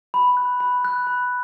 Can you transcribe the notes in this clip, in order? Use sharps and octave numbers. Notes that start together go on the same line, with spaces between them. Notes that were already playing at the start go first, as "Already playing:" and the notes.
B5
F#6
B5
F#6
B5